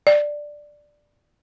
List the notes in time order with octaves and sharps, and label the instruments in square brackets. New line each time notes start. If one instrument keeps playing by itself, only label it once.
[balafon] D5